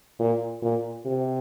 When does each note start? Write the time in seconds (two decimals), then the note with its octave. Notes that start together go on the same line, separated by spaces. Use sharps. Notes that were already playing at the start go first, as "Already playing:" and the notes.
0.20 A#2
0.62 A#2
1.06 C3